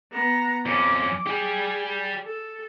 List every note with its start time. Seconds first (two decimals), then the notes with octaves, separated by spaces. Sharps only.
0.12 B3 A#5
0.66 F2 C#4 D6
1.27 G4 G#4 D5
2.25 A4